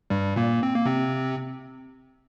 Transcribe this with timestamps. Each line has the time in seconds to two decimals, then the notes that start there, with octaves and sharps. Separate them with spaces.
0.10 G2 G3
0.36 A#2 A#3
0.63 C4
0.75 A#3
0.85 C3 C4